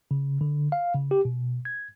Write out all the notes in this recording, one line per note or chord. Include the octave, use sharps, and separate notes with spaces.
C#3
D3
F5
C#3
G4
B2
G#6